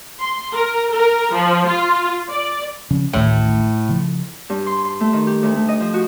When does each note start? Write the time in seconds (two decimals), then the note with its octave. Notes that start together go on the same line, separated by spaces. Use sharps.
0.20 C6
0.53 A#4
0.93 A#4
1.35 F3
1.68 F4
2.31 D5
2.91 C#3 F3 C#4
3.13 A1 D2 A2 D#3
3.89 C#3 F3
4.50 G2
4.66 C6
4.85 C6
5.00 A3
5.13 D#3
5.27 G4
5.43 D2
5.56 A3
5.68 D#5
5.80 F3
5.94 F#4